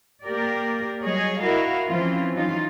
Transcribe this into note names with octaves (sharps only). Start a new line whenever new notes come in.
A#3 G4 A#4 D5
F#3 G3 G#4 C#5 D#5
E4 F#4 A#4 D#5 F5
E3 F3 C4 C#4 F4
E3 F#3 D#4 F4